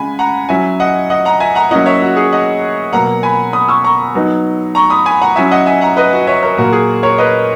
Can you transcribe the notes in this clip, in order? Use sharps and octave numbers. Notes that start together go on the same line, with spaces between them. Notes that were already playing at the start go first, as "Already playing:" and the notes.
Already playing: C#3 G#3 G#5 B5
F#5 A#5
F#3 C#4 E4 E5 G#5
D#5 F#5
D#5 F#5
F#5 A#5
E5 G#5
F#5 A#5
F#3 A#3 C#4 E4 D#5 F#5
C#5 E5
F#4
G#4
D#5 F#5
B2 F#3 A#3 F#5 A#5
G#5 B5
B5 D#6
C#6 E6
A#5 C#6
F#3 B3 D#4
A#5 C#6
B5 D#6
G#5 B5
F#5 A#5
F#3 C#4 E4 E5 G#5
D#5 F#5
E5 G#5
F#5 A#5
B4 D#5
F#4
C#5 E5
A#4 C#5
A#2 F#3 A#3 F#4 A#4
G#4
A#4 C#5
B4 D#5